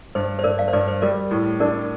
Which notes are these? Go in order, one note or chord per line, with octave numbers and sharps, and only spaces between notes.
G2 C5
C5
G2 A#4 D5
D5 F5
C5
G2 A#4 D5
C5
G3 A#4 D5
A2
D4 A#4 D5